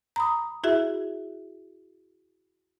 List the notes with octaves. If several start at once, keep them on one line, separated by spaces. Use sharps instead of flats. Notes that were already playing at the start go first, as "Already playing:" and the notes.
A#5 B5 D#6
E4 F#4 G#4 E5